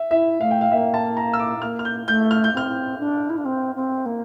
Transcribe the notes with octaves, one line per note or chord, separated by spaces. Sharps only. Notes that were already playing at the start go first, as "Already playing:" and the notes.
Already playing: E5
E4 E5
A3 F5
G5
F5
A#3 E5
A5
A#5
E6
D6
A#3 F6
F6
G6
A3 G6
F6
G6
C4 F6
D4
E4
D4
C4
C4
A#3